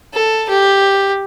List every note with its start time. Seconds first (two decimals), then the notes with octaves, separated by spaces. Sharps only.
0.14 A4
0.49 G4